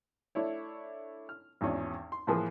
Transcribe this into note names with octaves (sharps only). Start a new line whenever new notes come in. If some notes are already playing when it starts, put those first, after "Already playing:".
A3 D4 E4 C#5
F6
G#1 E2 C#4 D4
C6
A2 E3 F3 A#3 G#4 B4